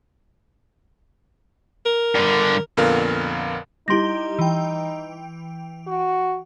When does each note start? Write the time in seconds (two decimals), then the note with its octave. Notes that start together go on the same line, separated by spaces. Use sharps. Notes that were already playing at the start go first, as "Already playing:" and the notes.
1.86 A#4
2.15 G2 D3
2.77 F2 A#2 D3 B3 A#4 F5
3.88 G3 D#4 E4 G4 C6 A#6
4.39 E3 G5
5.87 F#4